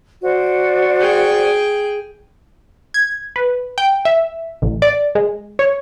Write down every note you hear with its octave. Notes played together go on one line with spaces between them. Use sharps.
F#4 C5 D5
G#4 G5
G#6
B4
G5
E5
A1
D5
G#3
C#5